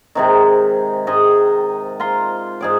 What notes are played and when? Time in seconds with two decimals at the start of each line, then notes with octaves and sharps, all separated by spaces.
0.15 G#2 C3 D#3
1.07 G#2 D#5 G#5
2.00 F4 A#5 C6
2.61 G#2 G#4 D5